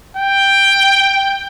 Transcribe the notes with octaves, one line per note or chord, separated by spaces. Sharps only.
G5